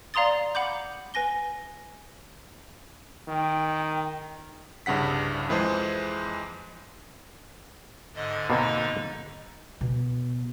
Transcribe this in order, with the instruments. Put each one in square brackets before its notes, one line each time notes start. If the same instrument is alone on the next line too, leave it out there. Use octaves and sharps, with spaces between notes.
[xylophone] D5 F5 A#5 C6 D#6 A6
F#5 B5 D6 G6
B4 G#5 A#6 G7
[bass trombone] D#3 [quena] G5
[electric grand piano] C2 G2 C#3 F#5 B6
F2 E3 G#3 G#4 C5
[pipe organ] G#2 D3 [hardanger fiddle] D#5
[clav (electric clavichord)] B2 A#3 C4 [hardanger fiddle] D#4
[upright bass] B2 B3